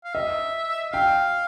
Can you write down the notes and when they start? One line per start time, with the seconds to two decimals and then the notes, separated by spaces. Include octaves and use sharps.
0.04 F5
0.14 D#5 E5
0.92 F5 G5